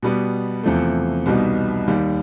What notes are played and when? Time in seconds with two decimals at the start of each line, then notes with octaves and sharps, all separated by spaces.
0.03 B2 G3 B3
0.63 E2 C3 F3 A3
1.26 C2 B2 G3 B3 D#4
1.88 D#2 D#3 G3